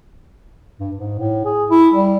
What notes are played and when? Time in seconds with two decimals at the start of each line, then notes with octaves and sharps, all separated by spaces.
0.80 G2
0.97 G#2
1.19 A2
1.45 G#4
1.70 E4
1.94 G3